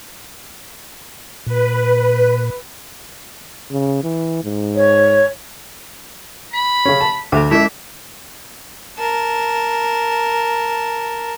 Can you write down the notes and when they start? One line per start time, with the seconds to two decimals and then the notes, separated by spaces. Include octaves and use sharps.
1.46 A#2 B4
3.71 C#3
4.03 E3
4.44 G#2
4.76 C#5
6.53 B5 B6
6.85 C#3 C#4
7.01 A5
7.32 D2 A4 E5 D6
7.51 G#3 C#4 E4 E5
8.98 A#4 A5